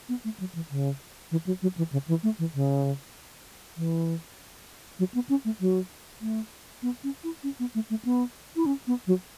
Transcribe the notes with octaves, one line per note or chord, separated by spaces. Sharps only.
B3
A3
F#3
E3
C#3
E3
F#3
F#3
E3
C#3
E3
A3
E3
C#3
E3
F#3
B3
C#4
A3
F#3
A3
B3
C#4
E4
C#4
B3
A3
A3
B3
E4
C#4
B3
F#3